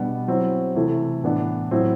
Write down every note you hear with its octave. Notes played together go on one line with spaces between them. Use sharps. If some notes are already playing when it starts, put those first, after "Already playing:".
Already playing: B2 G3 B3 D4
F#3 C4 E4
C3 E3 A3 E4
A2 E3 B3 D4
A2 F#3 C4 E4